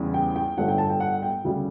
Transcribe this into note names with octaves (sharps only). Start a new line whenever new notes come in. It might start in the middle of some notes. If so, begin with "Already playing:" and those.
Already playing: E2 C#3 G3
G5
G5
G1 G2 D3 A3 F#5
G5
A5
G5
F#5
G5
D2 C#3 G3